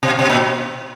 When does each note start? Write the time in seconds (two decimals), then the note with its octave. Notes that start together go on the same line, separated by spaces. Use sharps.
0.03 B2
0.19 B2
0.29 A#2